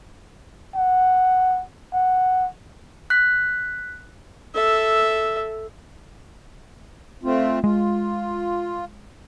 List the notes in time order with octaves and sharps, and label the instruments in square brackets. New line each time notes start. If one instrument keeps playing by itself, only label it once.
[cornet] F#5
F#5
[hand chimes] F#6 B6
[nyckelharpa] A4 E5
[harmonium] A3 C4 F4
[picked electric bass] G#3 [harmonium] F4